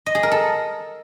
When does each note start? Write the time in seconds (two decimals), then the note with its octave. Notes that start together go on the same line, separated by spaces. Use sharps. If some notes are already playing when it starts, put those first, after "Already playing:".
0.06 D#5
0.15 G#4
0.23 A#4
0.32 A4